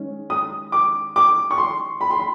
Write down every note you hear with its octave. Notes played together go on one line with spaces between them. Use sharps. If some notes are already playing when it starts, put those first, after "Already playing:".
Already playing: D#3 G#3 C#4
D#6
D6
D6
C#6
C6
B5
C6
B5